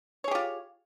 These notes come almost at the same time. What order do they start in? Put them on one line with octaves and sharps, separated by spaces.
C#5 G#4 G4 F4